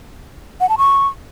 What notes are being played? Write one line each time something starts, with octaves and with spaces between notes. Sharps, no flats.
F#5
A5
C#6